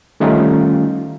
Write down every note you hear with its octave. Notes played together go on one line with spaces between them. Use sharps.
D#3 G3 A3 C#4 D#4 F4